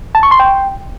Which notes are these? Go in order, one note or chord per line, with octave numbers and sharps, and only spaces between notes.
A5
C#6
C6
G5